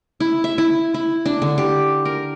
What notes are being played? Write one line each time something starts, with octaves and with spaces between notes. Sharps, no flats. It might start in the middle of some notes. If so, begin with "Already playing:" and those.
E4
E5
E4
E4
D4
D3
G4
A#4